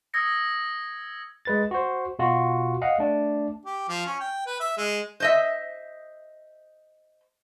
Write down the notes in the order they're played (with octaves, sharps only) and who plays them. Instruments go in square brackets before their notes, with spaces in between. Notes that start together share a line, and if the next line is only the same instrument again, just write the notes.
[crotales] D#6 E6 G#6 A#6 C#7
[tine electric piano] G#3 B4 A6
F#4 C5
B2 F4 F#4
D#5 F5 F#5
A3 D4
[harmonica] G4
F3
C#4
G5
B4
E5
G#3
[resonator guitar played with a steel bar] C5 D#5 E5